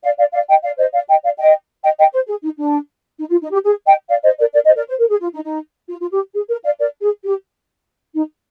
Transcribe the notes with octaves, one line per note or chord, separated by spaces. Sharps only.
D5 F5
D5 F5
D5 F5
D#5 G5
D5 F5
C5 D#5
D5 F5
D#5 G5
D5 F5
D#5 G5
D#5 G5
D#5 G5
C5
G#4
D#4
D4
D#4
F4
D#4
G4
G#4
D#5 G5
D5 F5
C5 D#5
A#4 D5
A#4 D5
C5 D#5
A#4 D5
C5
A#4
G#4
F4
D#4
D#4
F4
F4
G4
G#4
A#4
D5 F5
A#4 D5
G#4
G4
D#4